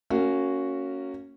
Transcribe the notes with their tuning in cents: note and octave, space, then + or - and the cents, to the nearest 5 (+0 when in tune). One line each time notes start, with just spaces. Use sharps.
A#3 -25 C#4 +0 F#4 +0